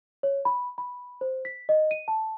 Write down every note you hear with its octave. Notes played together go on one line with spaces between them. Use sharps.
C#5
B5
B5
C5
B6
D#5
D#7
A5